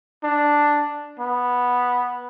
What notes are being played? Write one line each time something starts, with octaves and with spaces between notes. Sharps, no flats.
D4
B3